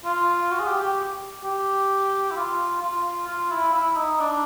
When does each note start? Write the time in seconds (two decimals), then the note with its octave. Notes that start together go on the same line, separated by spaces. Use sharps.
0.05 F4
0.51 F#4
0.60 G#4
0.67 G4
0.82 G4
1.44 G4
2.31 E4
2.36 F4
2.82 F4
3.28 F4
3.51 E4
3.73 E4
3.97 D#4
4.20 D4